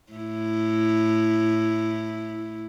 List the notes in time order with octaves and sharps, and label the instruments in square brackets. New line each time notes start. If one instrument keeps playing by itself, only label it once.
[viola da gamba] A2 E4